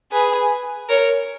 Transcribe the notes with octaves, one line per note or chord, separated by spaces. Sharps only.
G#4 B4
A#4 C#5